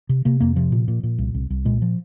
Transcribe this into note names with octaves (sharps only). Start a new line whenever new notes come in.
C3
C3 A#3
F2 A#3
C3 F3
A#2
A#2
A#2
C2
C2
C2
A#2 G#3
F3